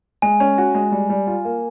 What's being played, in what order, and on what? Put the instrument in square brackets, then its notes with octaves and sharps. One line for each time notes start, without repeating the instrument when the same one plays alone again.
[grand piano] G#3 [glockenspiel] G#5
[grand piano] C#4
F#4
G#3
G3
G3
F4
A#3